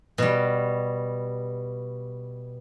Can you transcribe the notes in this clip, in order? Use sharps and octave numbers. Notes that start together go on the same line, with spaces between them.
B2 G3